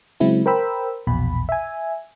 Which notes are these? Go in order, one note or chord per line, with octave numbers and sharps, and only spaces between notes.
C#3 F#3 G#3 C4 E4
A#4 C5 G5 B5 E6
A#1 E2 B2 B5
E5 G#5